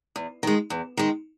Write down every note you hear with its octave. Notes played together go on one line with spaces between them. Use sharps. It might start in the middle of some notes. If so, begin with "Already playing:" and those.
E2
D#3 G#3
E2
D#3 G#3